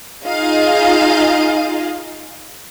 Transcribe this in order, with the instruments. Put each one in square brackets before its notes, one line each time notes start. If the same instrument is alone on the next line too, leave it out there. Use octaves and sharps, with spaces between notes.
[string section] D#4 F4 G#4 D#5 F5